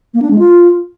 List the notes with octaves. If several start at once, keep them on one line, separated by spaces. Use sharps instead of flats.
A#3
D4
G#3
F4